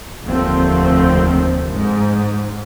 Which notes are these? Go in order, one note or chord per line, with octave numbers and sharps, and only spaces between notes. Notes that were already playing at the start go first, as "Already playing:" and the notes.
F1 D#2 D3 F3 A3 C4
G#2